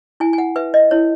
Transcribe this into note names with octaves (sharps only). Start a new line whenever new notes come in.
E4 G#5
G#5
F#5
B4 E5
D#5
E4 C#5